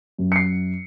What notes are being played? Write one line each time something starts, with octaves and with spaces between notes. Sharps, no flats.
F#2
C#7
C7